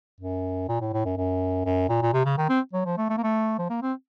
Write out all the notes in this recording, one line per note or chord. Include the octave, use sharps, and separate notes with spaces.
F#2
A#2
A2
A2
F#2
F#2
F#2
A#2
A#2
C3
C#3
D#3
C4
F#3
F3
A3
A3
A#3
A3
F3
A#3
C4